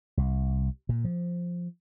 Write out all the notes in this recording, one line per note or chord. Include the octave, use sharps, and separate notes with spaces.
C2
A#2
F3